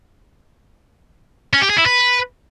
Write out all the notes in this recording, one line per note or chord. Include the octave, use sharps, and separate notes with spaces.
C#4
G4
G#4
E4
B4